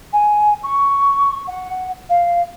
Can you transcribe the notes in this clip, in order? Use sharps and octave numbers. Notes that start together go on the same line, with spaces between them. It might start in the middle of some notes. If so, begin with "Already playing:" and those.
G#5
C#6
F#5
F5